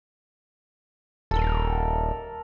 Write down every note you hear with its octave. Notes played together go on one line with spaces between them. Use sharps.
D#1 A4 A#4